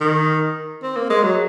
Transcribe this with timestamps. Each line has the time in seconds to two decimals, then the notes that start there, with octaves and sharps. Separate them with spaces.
0.01 D#3
0.83 C4
0.96 A#3
1.10 G#3
1.23 F#3